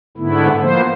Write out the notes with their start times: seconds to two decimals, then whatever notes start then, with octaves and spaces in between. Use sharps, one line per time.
0.17 G#2 D3 A3 B3 E4
0.60 F3 A#3 B3 C5